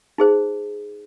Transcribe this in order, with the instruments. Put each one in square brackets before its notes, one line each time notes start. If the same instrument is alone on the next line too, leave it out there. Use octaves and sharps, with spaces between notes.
[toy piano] D#4 G#4 C5